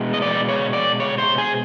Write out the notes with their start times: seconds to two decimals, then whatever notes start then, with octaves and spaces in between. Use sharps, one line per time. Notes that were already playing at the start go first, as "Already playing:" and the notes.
Already playing: B2 G#3 B3
0.14 D#5
0.22 D5
0.48 C#5
0.73 D5
1.00 C#5
1.18 C5
1.38 G#4